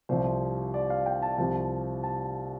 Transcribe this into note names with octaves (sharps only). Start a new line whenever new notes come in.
C2 C3 F3 C5
D5
F5
G5
A5
C2 C3 F3 A5
A5